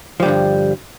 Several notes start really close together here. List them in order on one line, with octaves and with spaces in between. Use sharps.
F3 G3 D3 G2